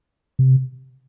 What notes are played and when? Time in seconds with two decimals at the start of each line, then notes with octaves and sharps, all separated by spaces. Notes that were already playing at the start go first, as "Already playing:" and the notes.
0.39 C3